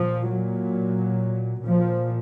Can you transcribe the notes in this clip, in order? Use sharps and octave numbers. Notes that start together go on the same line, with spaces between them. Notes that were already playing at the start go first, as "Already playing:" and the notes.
Already playing: A#2 F3
F#3
A#2 F3